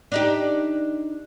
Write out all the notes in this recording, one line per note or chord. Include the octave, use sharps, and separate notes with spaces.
D4 D#4 G4